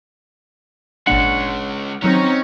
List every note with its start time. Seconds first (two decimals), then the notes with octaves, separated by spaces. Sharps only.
1.07 G#1 A#2 G#3 C#4 D4 F#5
2.02 D#3 F#3 C4 C#4 D#4 A#5